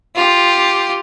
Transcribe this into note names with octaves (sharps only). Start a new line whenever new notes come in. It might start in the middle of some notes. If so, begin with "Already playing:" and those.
F4 G4